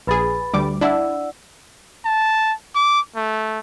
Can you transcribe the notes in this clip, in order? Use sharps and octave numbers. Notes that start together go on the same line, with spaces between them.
A#1 G#4 B4 B5 A6
D2 G3 D6
D4 E4 D5 F#5 E6
A5
D6
A3